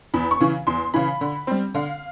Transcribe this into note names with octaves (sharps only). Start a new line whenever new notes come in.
E2 B5
C#6
C#3 E3
E2 C6
C#3 E3 B5
D3
G3 C4
D3 F5